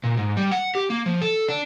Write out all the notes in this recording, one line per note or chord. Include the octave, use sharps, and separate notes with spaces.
A#2
G#2
G3
F#5
G4
A#3
F3
A4
D4